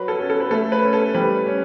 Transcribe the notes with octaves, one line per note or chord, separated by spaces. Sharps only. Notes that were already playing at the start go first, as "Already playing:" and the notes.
Already playing: F#3 B4
A4
C#4
A4
B4
A3 A4
B4
C#4
A4
G3 B4
C#4